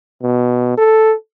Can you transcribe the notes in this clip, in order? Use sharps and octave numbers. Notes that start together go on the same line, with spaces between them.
B2
A4